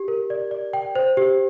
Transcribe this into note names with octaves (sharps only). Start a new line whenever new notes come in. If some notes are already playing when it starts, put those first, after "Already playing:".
Already playing: G4
A#4
D5
D5
G5
C5
G4